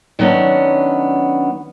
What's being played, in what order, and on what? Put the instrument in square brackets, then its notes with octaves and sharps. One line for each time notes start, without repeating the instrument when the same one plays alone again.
[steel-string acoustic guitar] D#3 F#3 G3 B3 C#4 D4